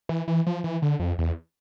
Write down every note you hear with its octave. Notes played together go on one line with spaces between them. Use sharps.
E3
E3
F3
E3
D3
F2
E2